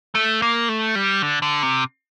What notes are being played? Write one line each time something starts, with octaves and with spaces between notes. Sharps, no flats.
A3
A#3
A3
G3
D3
D3
C3